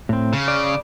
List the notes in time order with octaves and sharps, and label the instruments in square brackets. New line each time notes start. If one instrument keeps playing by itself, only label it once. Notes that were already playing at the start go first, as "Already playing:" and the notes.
[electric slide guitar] A2 C4
[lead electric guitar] C#3
[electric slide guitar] D5